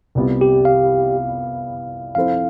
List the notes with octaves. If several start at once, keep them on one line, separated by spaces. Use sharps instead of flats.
C2 C3 G3 B3 F4
G4
F5
F3 C4 E4 A4 C5 F5